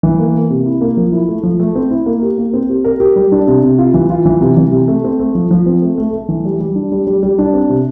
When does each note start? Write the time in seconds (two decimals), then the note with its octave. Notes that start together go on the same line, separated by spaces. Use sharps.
0.03 E3
0.19 A#3
0.35 A#3
0.50 C3
0.66 E4
0.81 A#3
0.97 F3
1.12 E4
1.28 A3
1.43 F3
1.60 A3
1.75 C4
1.91 E4
2.06 A#3
2.22 G4
2.38 A#3
2.53 C4
2.69 G4
2.85 A#4
3.00 G4
3.16 G3
3.32 D4
3.47 C3
3.63 C3
3.78 F4
3.94 E3
4.10 F4
4.26 E3
4.41 C3
4.57 E3
4.72 C3
4.88 A3
5.04 C4
5.20 A3
5.35 F3
5.51 F3
5.66 C4
5.82 A3
5.98 A3
6.13 A3
6.29 E3
6.45 G3
6.60 G3
6.75 D4
6.92 G3
7.07 G3
7.23 G3
7.38 D4
7.54 C4
7.70 C3